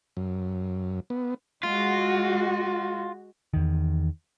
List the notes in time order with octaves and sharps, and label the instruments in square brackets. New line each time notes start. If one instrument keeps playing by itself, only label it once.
[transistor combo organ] F#2
B3
[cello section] G#3 F#4 [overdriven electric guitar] F4
[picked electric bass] E2 D#3